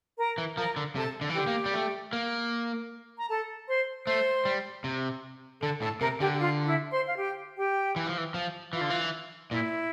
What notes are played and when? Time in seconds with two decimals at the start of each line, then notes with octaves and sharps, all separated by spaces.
0.18 A#4 A#5
0.38 E3
0.57 F3 A#4 A#5
0.76 D3
0.95 C3 A4 A5
1.21 D3
1.30 E3
1.35 D3 G4 G5
1.47 A#3
1.65 G3
1.74 A3
2.13 A#3
3.18 A#5
3.29 A4 A5
3.68 C5 C6
4.07 A3 C5 C6
4.45 G3
4.84 C3
5.62 D3 A4 A5
5.82 A2 A4 A5
6.01 C3 A#4 A#5
6.20 D3 G4 G5
6.34 G5
6.40 F4 F5
6.66 E4 E5
6.92 C5 C6
7.08 F5
7.18 G4 G5
7.57 G4 G5
7.96 E3
8.07 F3
8.18 E3
8.34 F3
8.73 E3 F4 F5
8.81 D3
8.90 E3
9.51 A#2 E4 E5